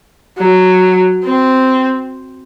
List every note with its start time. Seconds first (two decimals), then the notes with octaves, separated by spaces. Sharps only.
0.38 F#3
1.24 C4